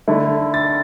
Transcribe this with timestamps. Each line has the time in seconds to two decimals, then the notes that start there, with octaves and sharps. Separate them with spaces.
0.08 D3 A3 E4
0.54 A6